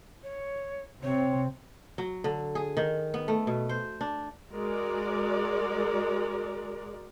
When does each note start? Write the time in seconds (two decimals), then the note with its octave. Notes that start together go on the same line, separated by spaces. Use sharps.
0.23 C#5
1.03 C3 C4 C#5
1.98 F#3
2.24 D3
2.55 G#4
2.77 D#3
3.14 B3
3.28 A3
3.47 B2
3.69 C5
4.01 D4
4.52 G#3 F#4 A#4 D5